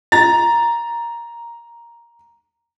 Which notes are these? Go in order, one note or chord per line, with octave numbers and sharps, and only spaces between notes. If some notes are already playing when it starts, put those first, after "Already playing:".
A#5 A6